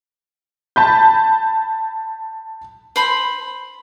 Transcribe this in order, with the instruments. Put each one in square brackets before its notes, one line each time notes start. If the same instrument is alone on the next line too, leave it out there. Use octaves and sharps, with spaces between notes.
[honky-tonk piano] A5 B5 G6
[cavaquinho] C5 B5 C6